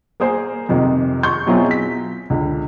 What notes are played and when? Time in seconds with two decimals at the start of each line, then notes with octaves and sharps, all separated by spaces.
0.20 A#3 G#4 A#4 C5
0.69 F2 C3 D#3
1.23 C6 C#6 G6
1.47 B2 F#3 C4 E4 F4 G#4
1.71 B6
2.30 C#2 D3